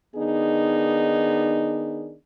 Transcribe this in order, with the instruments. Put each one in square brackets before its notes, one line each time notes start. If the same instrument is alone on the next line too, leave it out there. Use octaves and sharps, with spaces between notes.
[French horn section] D#3 B3 D4 D#4 G#4